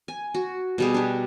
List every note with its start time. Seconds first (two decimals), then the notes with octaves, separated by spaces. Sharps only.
0.08 G#5
0.34 F#4
0.78 B2 G3 G#4
0.94 D4 G4